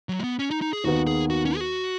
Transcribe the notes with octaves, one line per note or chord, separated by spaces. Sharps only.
F#3
G#3
B3
C#4
D#4
D#4
G#4
D#2 D#3 B3 F#4
G#4
F#4
C#4
G#4
F#4